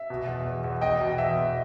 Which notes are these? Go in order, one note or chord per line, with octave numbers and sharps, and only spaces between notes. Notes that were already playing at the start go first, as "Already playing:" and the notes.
Already playing: E5
B2
E2
E2
E2
E2 D#5 G5
B2
E2 E5
E2